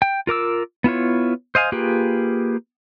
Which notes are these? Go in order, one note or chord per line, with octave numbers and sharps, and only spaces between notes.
G5
F4 A#4 D6 E6
B3 E4 F4 C#5
C5 D#5 F5 G#5
A#3 F4 G4 G#4 B4